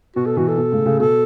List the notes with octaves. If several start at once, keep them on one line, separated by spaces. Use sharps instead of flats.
B2 F#4
A4
B2 E3 F#4
A4
B2
A2 C#3
A2 C#3
B2 A4